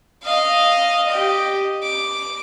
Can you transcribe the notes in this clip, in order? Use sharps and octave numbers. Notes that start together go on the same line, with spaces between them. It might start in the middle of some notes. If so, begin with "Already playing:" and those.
D#5 F5
G4 D#5
D6